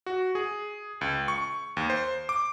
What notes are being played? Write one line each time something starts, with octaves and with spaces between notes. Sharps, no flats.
F#4
G#4
C#2
C#6
D#2
C5
D6